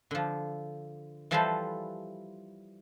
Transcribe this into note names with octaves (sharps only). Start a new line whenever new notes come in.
D3 F3
E3 F3 G3 A4 B4 C5